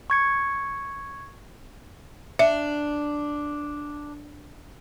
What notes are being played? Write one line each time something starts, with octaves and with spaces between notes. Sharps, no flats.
C#6 G#6 C#7
D4 E5